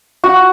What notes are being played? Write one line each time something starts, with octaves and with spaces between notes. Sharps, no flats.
F#4